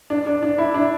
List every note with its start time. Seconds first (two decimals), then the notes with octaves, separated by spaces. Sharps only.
0.10 D4
0.27 D4
0.43 D4
0.58 E4
0.74 D4